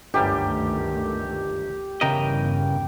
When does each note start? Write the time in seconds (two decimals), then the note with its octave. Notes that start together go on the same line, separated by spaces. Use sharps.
0.14 G1 C#2 F#2 D#3 G3 A3 G4
2.01 G1 E2 G2 C#3 A#4 D#5 E5 G5